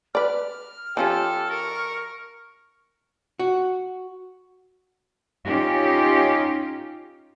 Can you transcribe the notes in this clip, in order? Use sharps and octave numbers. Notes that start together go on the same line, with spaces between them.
B4 D5 F6
F3 C#4 F4 G4 A4
A#4 C#6
F#4
C#4 D#4 F4 G4